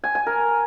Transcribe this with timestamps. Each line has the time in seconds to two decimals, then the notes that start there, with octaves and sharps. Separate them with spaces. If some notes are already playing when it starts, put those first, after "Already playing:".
0.04 G#5
0.15 G#5
0.27 A#4